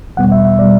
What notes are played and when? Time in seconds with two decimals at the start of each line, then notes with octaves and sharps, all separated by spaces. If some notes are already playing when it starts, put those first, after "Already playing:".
0.17 E2 B2 G3 B3 F#5
0.32 E5
0.45 E5
0.59 B2 G3 B3 D5